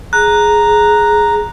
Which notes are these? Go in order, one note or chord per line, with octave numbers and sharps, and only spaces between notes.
G#4 A#5 F#6